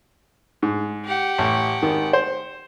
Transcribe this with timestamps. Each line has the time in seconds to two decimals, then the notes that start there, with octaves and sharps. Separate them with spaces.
0.63 G#2
1.06 G4 F#5
1.38 A1
1.82 G#1 D#3
2.13 C5